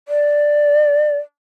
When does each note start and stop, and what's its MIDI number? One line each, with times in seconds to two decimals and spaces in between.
0.08 1.17 74